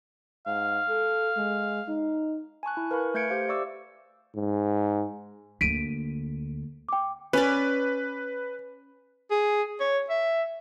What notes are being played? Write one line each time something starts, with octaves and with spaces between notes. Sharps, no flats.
G#2 F5
A4
G#3
D#4
G#5 A5 C#6 F#6
E4
A#4 B4 F5 G#5 B5 C#6
A3 G6 G#6 C#7 D7
G4 C5 F5
D5 E5 C#6 D6 E6
G#2
D2 A#3 B6 D7 D#7
G5 D6
C#4 B4 D5
G#4
C#5
E5